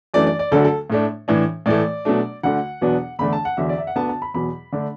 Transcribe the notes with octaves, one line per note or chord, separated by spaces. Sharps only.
F#2 E3 A3 D4 D5
D5
D5
D2 D3 F#3 A3 D4 A4
A4
A2 A3 D4
A2 E3 D4
A2 E3 A3 D5
B2 F#3 A3 D4
D2 D3 A3 F#5
E2 B2 F#3 B3 D4
E2 D3 A3 D4 B5
A5
F#5
E2 D3 F#3 E5
D5
E5
F#5
D2 D3 B3 D4 A5
A5
B5
E2 B2 F#3 B5
D3 A3 D4